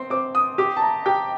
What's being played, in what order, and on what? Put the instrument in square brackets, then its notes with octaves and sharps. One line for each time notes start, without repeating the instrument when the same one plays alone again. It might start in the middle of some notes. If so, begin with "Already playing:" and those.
Already playing: [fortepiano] C4 [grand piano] C6
[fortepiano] C4 [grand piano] D6
[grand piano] D#6
[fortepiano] G4 [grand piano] D6
[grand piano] A5
A#5
[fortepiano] G4 [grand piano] G5